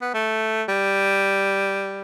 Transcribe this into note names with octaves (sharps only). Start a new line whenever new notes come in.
B3
A3
G3